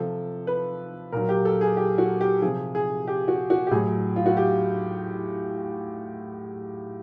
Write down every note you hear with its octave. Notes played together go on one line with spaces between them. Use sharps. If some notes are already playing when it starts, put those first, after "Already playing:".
Already playing: C3 F3 A4
B4
A#2 F#3 A#4
G4
A4
G#4
G4
F#4
G4
C3 F3 G#4
G#4
G4
F#4
F#4
G4
A2 F#3 G#4
F4
F#4
G4